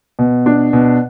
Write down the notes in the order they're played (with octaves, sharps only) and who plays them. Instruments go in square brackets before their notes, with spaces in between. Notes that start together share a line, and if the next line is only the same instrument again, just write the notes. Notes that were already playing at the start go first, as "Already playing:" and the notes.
[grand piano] B2
D4
B2